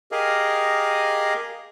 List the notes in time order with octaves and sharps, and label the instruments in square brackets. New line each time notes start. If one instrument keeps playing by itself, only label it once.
[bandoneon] G4 G#4 A#4 D#5 F5